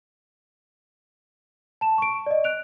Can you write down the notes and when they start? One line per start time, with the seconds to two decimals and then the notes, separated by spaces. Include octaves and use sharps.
1.81 A5 E7
1.98 C#6 D7
2.26 D5 D#5
2.44 F#6 D7 F7